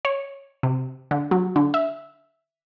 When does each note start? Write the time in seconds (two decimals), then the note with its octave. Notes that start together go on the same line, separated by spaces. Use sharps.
0.05 C#5
0.63 C3
1.11 D3
1.31 F#3
1.56 D3
1.74 E5